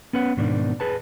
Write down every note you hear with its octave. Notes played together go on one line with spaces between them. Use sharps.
B3 C#4 B4 F#5
G#2 B2 D#3 D4
G#4 B4 A5